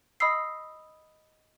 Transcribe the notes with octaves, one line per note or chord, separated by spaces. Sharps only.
D#5 B5 D#6 E6 C7